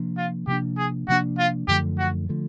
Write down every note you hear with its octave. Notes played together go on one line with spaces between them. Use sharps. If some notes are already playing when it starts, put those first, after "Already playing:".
Already playing: C3 F3 A#3 D4
F4
C3 F3 A#3 D4 G4
G#4
C3 F3 A#3 D4 F#4
F4
F#2 D3 F3 A3 G4
F#4
D3 F3 A3